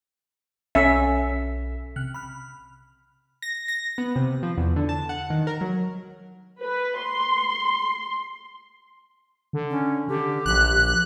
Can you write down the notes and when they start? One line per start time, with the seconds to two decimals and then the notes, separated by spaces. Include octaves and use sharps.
0.75 B1 C#4 A4 E5
1.96 C3 F6 F#6
2.14 B5 F6
3.42 A#6
3.68 A#6
3.98 B3
4.16 C3
4.43 F3
4.57 E2
4.76 D3
4.89 A5
5.09 F#5
5.30 D#3
5.47 A#4
5.61 F#3
6.61 B4
7.00 C6
9.53 D3
9.71 C#4
10.08 D3 G4
10.46 A#1 F#6